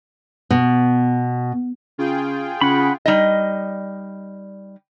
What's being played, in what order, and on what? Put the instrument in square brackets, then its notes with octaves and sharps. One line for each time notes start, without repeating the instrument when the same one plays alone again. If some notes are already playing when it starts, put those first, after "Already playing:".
[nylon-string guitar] B2
[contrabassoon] C#3 [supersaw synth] F4 G#4 G5
[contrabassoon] C#3 [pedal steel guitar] F#5 B5
[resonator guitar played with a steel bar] G3 D#4 D#5